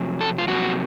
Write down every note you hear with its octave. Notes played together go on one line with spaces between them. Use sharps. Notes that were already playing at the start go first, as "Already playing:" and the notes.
Already playing: F2 C3 F#3
A4
F4
F2 C3 F#3 A#3 F#4